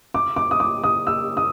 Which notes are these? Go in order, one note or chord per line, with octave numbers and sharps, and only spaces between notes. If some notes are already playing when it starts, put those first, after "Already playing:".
D6
D6
D#6
D6
D#6
E6
D#6